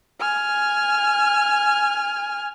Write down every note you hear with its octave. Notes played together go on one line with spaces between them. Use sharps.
G#5 F6